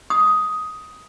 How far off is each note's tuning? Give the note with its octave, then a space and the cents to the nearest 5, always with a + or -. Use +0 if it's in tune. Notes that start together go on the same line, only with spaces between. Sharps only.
D#6 +10